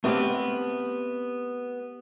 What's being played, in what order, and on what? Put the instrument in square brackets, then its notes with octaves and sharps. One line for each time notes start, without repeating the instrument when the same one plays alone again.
[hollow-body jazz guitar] A3 B3 C4 G4 C#5 F5